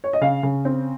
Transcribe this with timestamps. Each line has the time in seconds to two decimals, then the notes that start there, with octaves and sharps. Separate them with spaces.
0.04 C#5
0.13 D#5
0.21 C#3 F5
0.43 C#3
0.65 C4